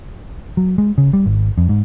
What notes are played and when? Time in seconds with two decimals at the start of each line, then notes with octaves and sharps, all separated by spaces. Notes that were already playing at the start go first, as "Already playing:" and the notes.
0.57 F#3
0.78 G#3
0.98 C#3
1.13 G3
1.26 G#1
1.58 F2
1.69 G#2